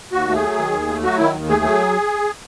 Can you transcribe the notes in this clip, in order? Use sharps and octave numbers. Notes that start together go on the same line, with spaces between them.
D#2 F#4
A3
G#4
F#3
D#3
D#2
A3
F#3 F#4
D#3 E4
D#2
A3 G#4
F#3